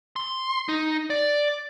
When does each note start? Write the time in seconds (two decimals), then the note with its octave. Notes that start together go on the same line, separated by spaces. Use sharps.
0.16 C6
0.69 D#4
1.10 D5